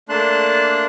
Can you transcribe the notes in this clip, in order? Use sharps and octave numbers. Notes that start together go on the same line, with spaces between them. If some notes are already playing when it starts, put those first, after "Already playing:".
A3 A#3 D4 A5 C6 F#6